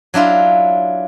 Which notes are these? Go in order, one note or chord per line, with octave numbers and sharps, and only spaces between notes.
F#3 D4 E4 F4